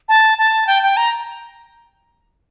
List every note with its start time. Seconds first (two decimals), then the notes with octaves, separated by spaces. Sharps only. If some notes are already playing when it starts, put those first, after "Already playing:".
0.09 A5
0.38 A5
0.67 G5
0.83 G5
0.97 A#5